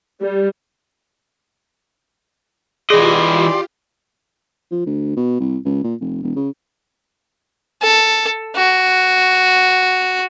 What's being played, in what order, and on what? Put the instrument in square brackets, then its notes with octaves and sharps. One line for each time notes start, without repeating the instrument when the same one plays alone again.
[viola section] G3
[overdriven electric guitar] E3 D#5 [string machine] F4 G4 [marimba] G#4 [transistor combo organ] D5 C6
[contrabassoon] F3
D2
B2
C2
C#2
A#2
F1
E1
C#3
[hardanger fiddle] A4
F#4